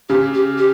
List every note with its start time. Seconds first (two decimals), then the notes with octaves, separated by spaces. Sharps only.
0.09 C#3 G4
0.33 G4
0.58 G4